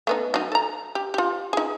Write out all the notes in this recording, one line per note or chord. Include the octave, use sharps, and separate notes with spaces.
A3 B3 D#4
F#3 D#4
A4 A#5
G4
F4 G4
D#4 G#4